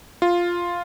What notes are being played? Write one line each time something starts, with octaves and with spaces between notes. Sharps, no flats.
F4